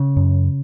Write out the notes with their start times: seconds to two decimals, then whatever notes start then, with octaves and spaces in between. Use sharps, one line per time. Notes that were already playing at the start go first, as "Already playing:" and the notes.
Already playing: C#3
0.17 F#2